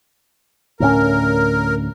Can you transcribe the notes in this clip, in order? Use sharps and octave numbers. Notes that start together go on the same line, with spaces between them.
D2 A2 C#4 A#4